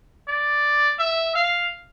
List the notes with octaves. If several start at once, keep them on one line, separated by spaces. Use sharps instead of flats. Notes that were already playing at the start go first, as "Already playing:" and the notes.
D5
E5
F5